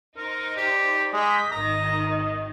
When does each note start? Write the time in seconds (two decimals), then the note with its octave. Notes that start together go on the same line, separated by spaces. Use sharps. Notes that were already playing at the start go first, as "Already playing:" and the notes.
0.17 D#4 A#4 C5
0.57 G4 D5
1.13 G#3 D#5 D6 G6 B6
1.52 G#1 D#3 D#5 A#5